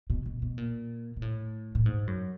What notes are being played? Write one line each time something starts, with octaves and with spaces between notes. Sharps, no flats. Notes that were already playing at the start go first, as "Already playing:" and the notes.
B2
B2
B2
A#2
A#2
A2
A2
G#2
F#2